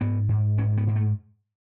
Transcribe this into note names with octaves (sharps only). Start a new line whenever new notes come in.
G#2 B3
G#2
G#2 C#4
B3
G#2
A3